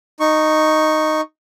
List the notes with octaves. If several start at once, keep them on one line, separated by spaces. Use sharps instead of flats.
D#4 C#6